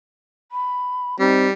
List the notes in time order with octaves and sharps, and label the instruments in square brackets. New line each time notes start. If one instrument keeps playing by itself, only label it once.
[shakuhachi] B5
[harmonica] G3 [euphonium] C4 [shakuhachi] D#4